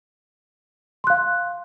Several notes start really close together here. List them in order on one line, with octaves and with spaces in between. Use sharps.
C6 F#6 F5